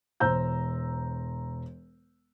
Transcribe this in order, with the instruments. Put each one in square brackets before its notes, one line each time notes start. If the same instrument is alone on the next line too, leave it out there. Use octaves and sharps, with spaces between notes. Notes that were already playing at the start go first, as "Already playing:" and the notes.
[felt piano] E1 C5 A#5 E6 G6